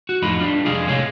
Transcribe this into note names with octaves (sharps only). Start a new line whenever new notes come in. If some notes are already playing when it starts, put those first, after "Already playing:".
F#4
F2 A2 D#4 F4 B5
G3 D4 F4
C2 F2 C3 G#3 G#4 F5
A2 C3 G#3 C#5 F5